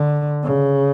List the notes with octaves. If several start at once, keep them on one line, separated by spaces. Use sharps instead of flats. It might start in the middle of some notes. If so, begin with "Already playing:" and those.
Already playing: D3
C#3